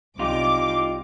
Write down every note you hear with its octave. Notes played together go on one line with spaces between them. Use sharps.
C2 D#4 F4 G4 D6